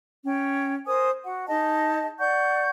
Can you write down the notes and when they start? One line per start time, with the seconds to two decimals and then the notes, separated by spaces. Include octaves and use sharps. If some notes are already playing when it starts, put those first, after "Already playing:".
0.25 C#4 G5
0.86 A#4 C5 G#5 D#6
1.23 F#4 F#5
1.48 D#4 G#4 D#5 A5
2.19 D5 F#5 C#6 G6